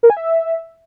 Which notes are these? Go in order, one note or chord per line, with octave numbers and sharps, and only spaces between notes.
A#4
G#5
E5